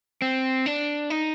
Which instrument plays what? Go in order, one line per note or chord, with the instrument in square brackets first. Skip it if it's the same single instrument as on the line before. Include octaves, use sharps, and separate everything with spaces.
[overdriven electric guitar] C4
D4
D#4